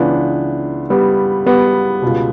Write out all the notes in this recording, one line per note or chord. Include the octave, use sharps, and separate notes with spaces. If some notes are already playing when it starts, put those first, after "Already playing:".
Already playing: C#2 C#3 E3 B3 D4
G3 B3
G3 B3
C#2 B2